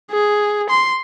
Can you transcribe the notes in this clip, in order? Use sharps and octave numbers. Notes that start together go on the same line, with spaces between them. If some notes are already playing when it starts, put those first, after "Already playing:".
G#4
C6